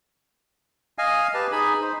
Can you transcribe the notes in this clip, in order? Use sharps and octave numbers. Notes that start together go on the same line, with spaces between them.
D#5 F5 G#5
G4 B4 A5
D#4 G#4 G#5 B5
D#4 C5